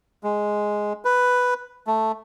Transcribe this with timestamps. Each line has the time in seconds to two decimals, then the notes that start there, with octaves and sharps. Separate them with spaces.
0.23 G#3
1.05 B4
1.87 A3